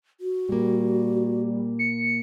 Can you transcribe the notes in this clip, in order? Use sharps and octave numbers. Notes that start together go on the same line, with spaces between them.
F#4
A#2 G3 A#3
C#7